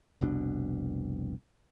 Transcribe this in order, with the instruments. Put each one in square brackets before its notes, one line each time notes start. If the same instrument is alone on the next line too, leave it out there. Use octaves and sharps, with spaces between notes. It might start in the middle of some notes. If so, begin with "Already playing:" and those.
[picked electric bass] F1 C2 B2 D4